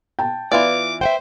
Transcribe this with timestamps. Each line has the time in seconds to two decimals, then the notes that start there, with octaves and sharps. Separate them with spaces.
0.19 G5 A5
0.52 E3 B3 F4 D5 D6
1.01 C5 E5 F#5 G5